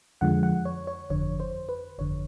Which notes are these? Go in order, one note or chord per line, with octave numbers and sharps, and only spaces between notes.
F2 D3 F3 G#3 F#5
F#5
C#5
C#5
G1 F2 D3 C#5
C5
B4
G1 F2 D3 C#5